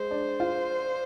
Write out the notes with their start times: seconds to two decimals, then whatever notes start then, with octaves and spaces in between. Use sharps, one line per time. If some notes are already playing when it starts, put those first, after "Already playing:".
Already playing: G#3 C5
0.11 D4
0.40 F4